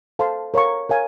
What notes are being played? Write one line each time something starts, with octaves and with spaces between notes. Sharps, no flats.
A4 C5 F5 A5 C6
A#4 C#5 F5 A#5 C#6
A#4 C#5 F5 G#5